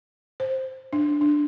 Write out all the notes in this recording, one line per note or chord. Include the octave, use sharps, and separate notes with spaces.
C5
D4
D4